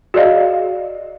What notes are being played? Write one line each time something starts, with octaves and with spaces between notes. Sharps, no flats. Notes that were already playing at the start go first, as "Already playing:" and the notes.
F#4 G#4 D5 D#5 F5